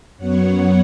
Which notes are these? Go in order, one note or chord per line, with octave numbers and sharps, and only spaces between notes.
F#2 F#3 B3 C#5 F#5